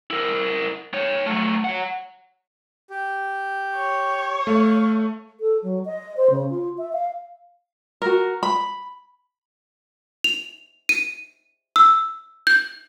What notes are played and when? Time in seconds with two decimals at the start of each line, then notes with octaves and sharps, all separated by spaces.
0.11 E4 A#4
0.94 D#4 C#5
1.26 F#3 A3
1.64 C#5 F#5
2.90 G4
3.76 C#5
4.47 A3 F5
5.40 A4
5.63 F#3
5.85 D#5
6.17 C5
6.30 C#3
6.50 F4
6.78 E5
6.93 F5
8.02 F#4 A#4
8.43 B5
10.24 F7
10.89 D#7
11.76 E6
12.47 G6